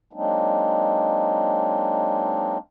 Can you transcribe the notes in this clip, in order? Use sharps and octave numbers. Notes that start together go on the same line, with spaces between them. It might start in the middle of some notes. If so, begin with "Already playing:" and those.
F#3 G#3 A#3 C4 D4 D#4